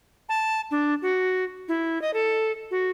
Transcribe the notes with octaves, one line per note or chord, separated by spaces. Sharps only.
A5
D4
F#4
E4
D#5
A4
F#4